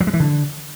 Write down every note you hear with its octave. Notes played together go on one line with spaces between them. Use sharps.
F#3
G#3
E3
D3